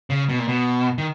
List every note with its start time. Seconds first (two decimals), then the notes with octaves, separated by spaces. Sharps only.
0.10 C#3
0.29 B2
0.39 A#2
0.48 B2
0.98 D#3